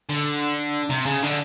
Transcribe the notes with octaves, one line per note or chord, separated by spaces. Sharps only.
D3
C3
C#3
D3